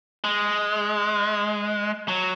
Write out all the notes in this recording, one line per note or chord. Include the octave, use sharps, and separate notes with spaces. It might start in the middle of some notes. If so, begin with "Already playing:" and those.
G#3
F#3